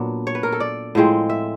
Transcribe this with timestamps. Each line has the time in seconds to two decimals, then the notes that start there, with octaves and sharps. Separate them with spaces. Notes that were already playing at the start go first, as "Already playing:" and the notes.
Already playing: A#2 F#3 B3 D4
0.27 C#5
0.35 B4
0.43 A#4
0.52 A4
0.60 D5
0.95 A2 F3 G#3 C4
1.30 E5